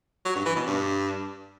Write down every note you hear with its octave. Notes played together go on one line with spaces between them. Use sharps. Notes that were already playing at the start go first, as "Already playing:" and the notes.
F#3
G2
E3
B2
G2